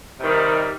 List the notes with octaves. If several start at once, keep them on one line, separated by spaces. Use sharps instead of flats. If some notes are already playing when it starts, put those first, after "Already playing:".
C3 D#3 G3 A#3 D#4